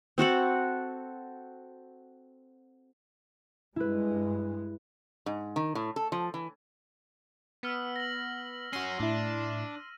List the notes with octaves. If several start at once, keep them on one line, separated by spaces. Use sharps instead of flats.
C4 F#4 A4 F#5
G2 G#3 E4 B4
G#2
D#3
A2
A4
F3
E3
B3 E6 F6 B6
A#6 F#7
C#4 F#4 C6 D#7
A2 D4 E4